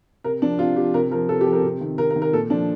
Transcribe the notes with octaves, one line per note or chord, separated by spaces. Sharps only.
C3 A#4
F3 D4
C3 F4
F3 G4
C3 A#4
F3 A#4
C3 A4
G4
F3
A#4
C3
D#3
C3 A#4
A#4
D#3
A#4
A#2 A4
F3 D4